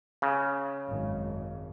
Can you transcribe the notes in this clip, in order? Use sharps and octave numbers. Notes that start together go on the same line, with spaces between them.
C#3
G#1 F#2